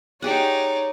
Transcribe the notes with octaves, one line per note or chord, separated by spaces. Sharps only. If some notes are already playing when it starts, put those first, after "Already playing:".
D#4 G4 G#4 C#5 D5 F#5